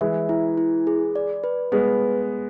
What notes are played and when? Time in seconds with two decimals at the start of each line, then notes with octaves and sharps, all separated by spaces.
0.01 E3 G#3 E5
0.29 E4
0.58 E4
0.87 G#4
1.16 D5
1.44 B4
1.72 G#3 B3 B4